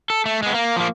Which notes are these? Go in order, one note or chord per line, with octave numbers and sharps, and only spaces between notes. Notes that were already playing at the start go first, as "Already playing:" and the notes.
A4
A3
G#3 B3
A#3
F3 A#3